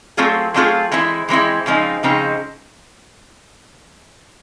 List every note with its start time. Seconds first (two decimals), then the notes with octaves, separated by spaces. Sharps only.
0.17 F#3 A3 C4 F4 G#4
0.54 F#3 A3 C4 F4 G#4
0.91 E3 G#3 C4 E4
1.29 E3 G#3 C4 E4
1.66 C#3 F3 G#3 C4 D#4
2.03 C#3 F3 G#3 C4 D#4